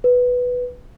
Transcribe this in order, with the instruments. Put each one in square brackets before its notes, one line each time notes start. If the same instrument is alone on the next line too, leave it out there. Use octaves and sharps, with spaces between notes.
[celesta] B4